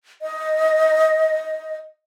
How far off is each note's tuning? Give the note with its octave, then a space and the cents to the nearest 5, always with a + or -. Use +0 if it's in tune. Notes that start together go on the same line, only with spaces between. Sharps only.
D#5 +10